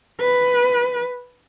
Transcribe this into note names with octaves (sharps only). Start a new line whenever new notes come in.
B4